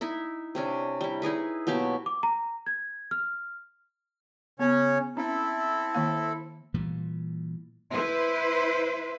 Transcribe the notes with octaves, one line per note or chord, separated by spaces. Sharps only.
D#4 E4 E5
C3 C#4 D4
G3 E4
D#4 E4 G#4 B4
B2 F#3 A#3 G4
D6
A#5
G#6
F6
C#3 B3 C#4 C#5
C4 C#4 E4 A4 E5
D#3 A#3 F5
A#2 E3 G3
E4 B4 C5